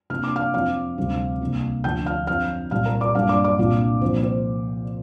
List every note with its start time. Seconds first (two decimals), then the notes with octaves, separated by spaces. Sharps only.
0.10 C3 A#3 D4 F6
0.24 D6
0.36 F5 F6
0.54 F2 F3 C4 F5 F6
0.98 D2 C3 G3 C4
1.41 C2 C3 A#3
1.84 D2 D3 F3 D4 G5 G6
2.06 F5 F6
2.27 F2 F3 C4 F5 F6
2.71 C2 A#2 G3 C4 F5 F6
2.86 A#4 A#5
3.00 D5 D6
3.15 G2 G3 A#3 D4 F5 F6
3.29 D5 D6
3.44 D5 D6
3.58 C2 A#2 A#3 D4 F4 F5
4.02 C2 A#2 F3 A#3 C5
4.23 C5